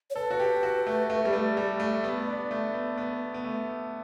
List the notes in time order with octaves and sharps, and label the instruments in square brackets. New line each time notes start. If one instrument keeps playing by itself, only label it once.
[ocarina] C#5
[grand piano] A4 [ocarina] B4
[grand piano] F#4
G4
F#4
A3
A3
G3
A3
G3
A3
B3
D4
A3
B3
B3
B3
A3